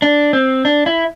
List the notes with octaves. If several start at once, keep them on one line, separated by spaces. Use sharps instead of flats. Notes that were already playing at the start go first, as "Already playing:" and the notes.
D4
C4
D4
E4